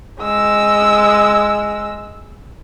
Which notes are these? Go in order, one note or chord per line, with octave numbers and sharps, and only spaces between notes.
G#3 E6